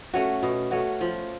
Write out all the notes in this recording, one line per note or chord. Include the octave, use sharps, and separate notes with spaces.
A3 C#4 F#4
B2
A3 C#4 F#4
F3